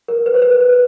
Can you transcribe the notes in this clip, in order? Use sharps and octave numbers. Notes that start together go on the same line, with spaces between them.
A#4
B4
C5
B4
B4